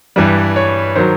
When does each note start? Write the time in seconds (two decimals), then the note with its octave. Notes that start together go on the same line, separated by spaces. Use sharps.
0.16 G2 E3 G3
0.56 C#5
0.96 D#3 F#3 C5